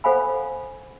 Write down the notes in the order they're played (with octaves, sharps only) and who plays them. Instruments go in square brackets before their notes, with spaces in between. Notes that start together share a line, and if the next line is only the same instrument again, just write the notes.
[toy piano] A4 C5 F5 F#5 G#5 B5